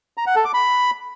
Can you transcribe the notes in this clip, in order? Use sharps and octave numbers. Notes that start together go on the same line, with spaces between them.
A#5
F#5
A4
D6
B5